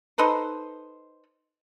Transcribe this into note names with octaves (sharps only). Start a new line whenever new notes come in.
D#4 A4 B4 C5